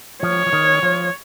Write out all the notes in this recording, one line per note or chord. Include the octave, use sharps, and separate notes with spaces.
F3 C#5
F3
D#3
F3